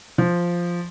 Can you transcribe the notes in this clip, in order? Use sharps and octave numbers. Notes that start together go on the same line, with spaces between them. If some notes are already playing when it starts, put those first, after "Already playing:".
F3